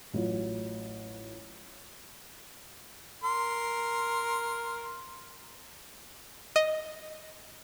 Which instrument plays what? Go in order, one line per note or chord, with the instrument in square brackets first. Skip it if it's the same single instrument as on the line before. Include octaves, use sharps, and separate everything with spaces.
[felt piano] A1 F#3 F4
[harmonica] A#4 C6
[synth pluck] D#5